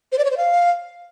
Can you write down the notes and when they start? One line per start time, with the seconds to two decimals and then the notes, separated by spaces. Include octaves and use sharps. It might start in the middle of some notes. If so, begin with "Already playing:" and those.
0.12 C5
0.18 D5
0.25 C#5
0.31 C5
0.37 F5